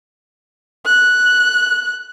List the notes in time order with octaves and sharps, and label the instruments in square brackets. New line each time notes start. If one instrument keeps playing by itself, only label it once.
[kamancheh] F#6